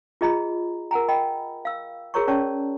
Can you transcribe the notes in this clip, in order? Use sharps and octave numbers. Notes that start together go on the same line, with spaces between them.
F4 G#4 D#5 A#5 B5
A#4 F#5 G#5 A#5
D#5 G5 B5
F5 E6
F#4 G#4 A#4 C#5 A#5 C#6
C#4 C#5 D5 A5 C#6